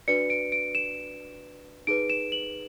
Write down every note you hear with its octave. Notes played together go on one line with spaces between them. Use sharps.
D4 F#4 B4 D5 C#7
D7
D7
E7
D#4 G#4 B4 D7
E7
F#7